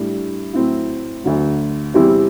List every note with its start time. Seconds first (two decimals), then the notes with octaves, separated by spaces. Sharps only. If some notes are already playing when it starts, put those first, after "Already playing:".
Already playing: A2 G3 D4
0.53 A2 F#3 C4 E4
1.24 D2 D3 F#3
1.94 E2 C3 G3 C4 E4